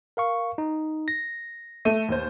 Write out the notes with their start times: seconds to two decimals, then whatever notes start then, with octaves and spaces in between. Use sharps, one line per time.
0.17 A#4 F5 C#6
0.58 D#4
1.08 A#6
1.85 A3 D#7
2.09 D#2 C5